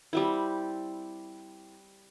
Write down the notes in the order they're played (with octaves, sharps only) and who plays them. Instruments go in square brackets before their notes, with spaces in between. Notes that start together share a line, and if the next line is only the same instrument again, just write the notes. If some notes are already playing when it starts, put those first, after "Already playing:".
[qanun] G3 C4 E4